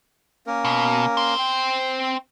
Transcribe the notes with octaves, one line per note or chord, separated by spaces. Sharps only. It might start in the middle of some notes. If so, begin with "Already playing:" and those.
A#3 C#4 A#4
B2
C4 C5
G5